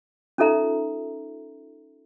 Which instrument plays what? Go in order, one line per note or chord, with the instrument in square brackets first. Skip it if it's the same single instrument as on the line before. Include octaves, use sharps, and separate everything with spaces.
[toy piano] C#4 D#4 F4 A4 E5 A#5